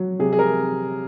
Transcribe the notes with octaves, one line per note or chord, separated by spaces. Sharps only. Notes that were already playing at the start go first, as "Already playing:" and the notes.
Already playing: F#3
C3 G#4
G#4
A#4